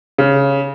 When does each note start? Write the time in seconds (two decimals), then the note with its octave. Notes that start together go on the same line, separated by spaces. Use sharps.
0.18 C#3